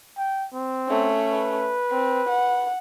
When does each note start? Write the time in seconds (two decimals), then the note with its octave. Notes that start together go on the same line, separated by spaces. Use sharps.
0.18 G5
0.54 C4
0.89 A3 C#4
1.32 B4
1.91 C4
2.29 F#5